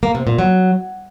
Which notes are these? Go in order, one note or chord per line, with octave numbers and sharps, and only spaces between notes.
A#3
C3
A#2
F#3